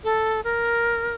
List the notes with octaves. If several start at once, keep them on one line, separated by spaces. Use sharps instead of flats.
A4
A#4